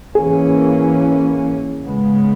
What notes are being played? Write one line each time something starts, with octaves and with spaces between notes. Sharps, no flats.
E3 A#3 C#4 G#4
C#3 G#3 B3